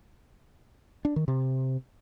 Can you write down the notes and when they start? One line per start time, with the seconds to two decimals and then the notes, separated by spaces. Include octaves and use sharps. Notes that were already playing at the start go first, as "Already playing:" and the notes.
1.05 D4
1.16 D#3
1.28 C3